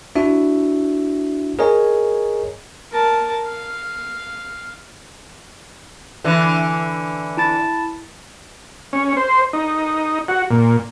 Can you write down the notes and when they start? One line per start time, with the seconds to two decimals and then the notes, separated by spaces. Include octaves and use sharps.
0.16 D4 E4 F#4 E5
1.59 G#4 A#4 C#5 D#5 G#5
2.92 A#4 A5
3.46 F5
6.24 D3 E3
7.37 E4 A5 A6
8.93 C#4
9.17 C5
9.53 D#4
10.28 F#4
10.50 A#2